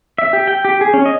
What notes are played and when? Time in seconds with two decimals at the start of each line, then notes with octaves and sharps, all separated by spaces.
0.18 E5
0.33 G4
0.48 G5
0.65 G4
0.81 G#4
0.94 C#4
1.06 D#5